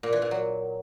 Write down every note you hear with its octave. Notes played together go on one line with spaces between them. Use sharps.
A#2
E3
A#2
F#3